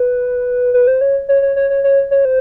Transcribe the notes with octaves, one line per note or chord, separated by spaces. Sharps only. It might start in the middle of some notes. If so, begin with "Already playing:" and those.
Already playing: B4
B4
C5
C#5
C#5
C#5
C#5
C#5
C#5
C#5
C5